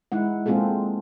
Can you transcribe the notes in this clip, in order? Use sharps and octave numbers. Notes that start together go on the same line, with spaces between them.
G#3 D#4 E4 F#5
G#3 A#3 C4 F4 G#4 A4